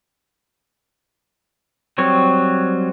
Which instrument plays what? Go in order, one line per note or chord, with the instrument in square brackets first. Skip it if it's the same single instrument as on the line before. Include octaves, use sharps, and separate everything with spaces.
[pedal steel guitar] F#3 G3 C4 C#5